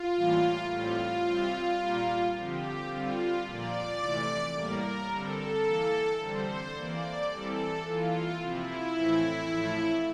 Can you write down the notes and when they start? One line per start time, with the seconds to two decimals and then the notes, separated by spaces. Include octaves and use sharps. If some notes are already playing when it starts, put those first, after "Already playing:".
Already playing: F4
0.15 A2 E3 G3 A#3
0.69 A2 G3 C4 F4
1.25 C3 G3 C4
1.80 A#2 G3 A#3
2.35 D3 F3 C4 G4
2.89 D3 G3 C4 F4
3.44 A#2 F3 A#3 D5
4.00 C3 E3 A3
4.55 A2 G3 A#3 A#4
5.10 D3 G3 C4 A4
5.65 E3 A#3
6.20 D3 G3 C4 C5
6.75 E3 A#3 D5
7.30 E3 G3 C4 A4
7.85 E3 A#3 F4
8.40 C3 F3 C4 E4
8.95 A2 E3 A3 C4
9.50 A2 F3 A3